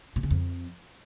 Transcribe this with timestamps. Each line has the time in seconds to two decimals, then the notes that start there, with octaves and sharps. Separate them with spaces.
0.16 B2
0.23 C#3
0.31 F2